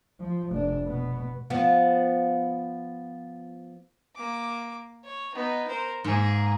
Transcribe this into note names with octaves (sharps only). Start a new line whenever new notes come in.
F3
F1 D4
B2 B3
F3 B3
A#3 D6
C#5
B3 D#4
A#4 C5
G#2 A#3 G#4 A#4